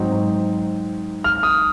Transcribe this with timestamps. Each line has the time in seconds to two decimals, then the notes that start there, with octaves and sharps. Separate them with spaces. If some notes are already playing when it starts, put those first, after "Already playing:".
Already playing: G#2 F#3 C4 D#4
1.24 F6
1.43 D#6